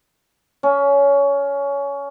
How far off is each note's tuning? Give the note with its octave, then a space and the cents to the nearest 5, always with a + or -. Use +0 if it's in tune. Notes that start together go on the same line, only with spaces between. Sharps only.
C#4 +20